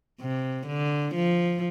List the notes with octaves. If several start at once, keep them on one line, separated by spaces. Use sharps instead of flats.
C3
D3
F3